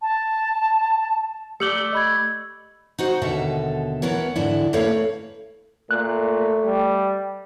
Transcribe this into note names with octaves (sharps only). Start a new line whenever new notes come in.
A5
A3 G4 D5 C#7 F#7 G7
D#5 B5 G#6
D#4 F#4 C5
D#2 B2 D3 A4 E5
E3 B3 E4 A#4 C#5
G#2 D3 E3 D4 E4
A3 A#3 C#4 B4 C#5 F5
A#2 A3 F#6
G3